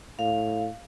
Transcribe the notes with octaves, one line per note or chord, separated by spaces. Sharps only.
A2 F5